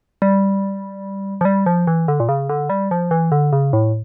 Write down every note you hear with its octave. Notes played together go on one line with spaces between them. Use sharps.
G3
F3
G3
F3
E3
D3
A#2
C#3
D3
G3
F3
E3
D3
C#3
A2